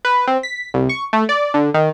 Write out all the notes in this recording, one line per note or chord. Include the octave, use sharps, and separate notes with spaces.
B4
C4
B6
C2
C#6
A3
D5
D3
D#3